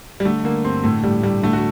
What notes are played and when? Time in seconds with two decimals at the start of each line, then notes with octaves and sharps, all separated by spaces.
0.20 G3
0.25 D3 A3
0.44 D3 A#3
0.64 G2 C4
0.84 A2 A3
1.04 A2 G3
1.23 A2 G3
1.43 D3 A3
1.53 F#4